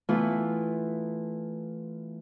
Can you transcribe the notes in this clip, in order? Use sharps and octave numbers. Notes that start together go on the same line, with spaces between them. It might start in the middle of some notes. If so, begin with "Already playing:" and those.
E3 A3 B3 E4 F4